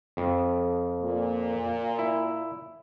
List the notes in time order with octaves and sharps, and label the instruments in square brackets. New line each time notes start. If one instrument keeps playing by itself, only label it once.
[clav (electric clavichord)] F2
[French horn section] A#2
[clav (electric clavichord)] E4